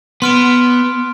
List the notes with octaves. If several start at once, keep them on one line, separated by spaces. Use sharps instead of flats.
B3 C6 F6 D7